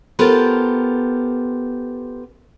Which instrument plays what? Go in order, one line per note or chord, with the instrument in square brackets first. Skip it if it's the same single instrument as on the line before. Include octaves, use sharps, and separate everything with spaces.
[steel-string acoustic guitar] B3 F4 G4 A4 A#4 C5